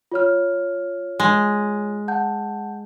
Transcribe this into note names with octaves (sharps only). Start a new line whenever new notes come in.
F4 C#5 F6
G#3
F#5 A5 G6